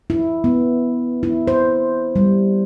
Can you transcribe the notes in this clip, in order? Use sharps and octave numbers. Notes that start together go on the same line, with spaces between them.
E4
B3
E4
C5
G3